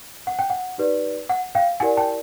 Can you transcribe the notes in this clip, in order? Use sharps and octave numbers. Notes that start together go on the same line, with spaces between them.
F#5
G5
F#5
D#4 G4 B4 D5
F#5
F5 G5
E4 G4 A#4 D5 F#5 G#5
G5 A5